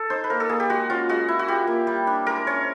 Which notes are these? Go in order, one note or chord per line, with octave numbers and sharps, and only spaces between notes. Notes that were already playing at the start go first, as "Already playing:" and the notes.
Already playing: A4
D#4 C5
B4
A#3 A#4
A4
A#3 G#4
G4
G#3 F#4
C#4 F4
G#3 F#4
E4
F#4
F4 G4
A#3
G3
D4
G#3 A#4
C#4 C#5